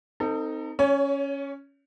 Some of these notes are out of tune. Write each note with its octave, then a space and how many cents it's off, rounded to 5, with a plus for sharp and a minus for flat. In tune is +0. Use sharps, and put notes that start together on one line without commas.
C4 -10 D#4 +0 A4 +35
C#4 +0 C#5 +30